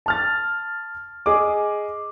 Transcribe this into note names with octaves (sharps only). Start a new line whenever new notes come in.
A5 F6 A6
G#4 D#5 D6